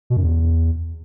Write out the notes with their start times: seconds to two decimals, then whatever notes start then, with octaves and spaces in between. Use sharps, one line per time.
0.10 B2
0.17 F#2
0.23 E2